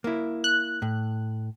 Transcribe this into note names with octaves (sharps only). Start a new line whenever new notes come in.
A#3 E4
F#6
A2